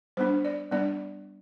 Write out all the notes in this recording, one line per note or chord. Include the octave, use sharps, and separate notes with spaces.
G3 B3 D4 C5
D5
G3 B3 D4 D5